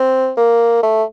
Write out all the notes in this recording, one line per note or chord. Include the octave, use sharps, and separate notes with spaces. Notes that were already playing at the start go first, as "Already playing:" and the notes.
Already playing: C4
A#3
A3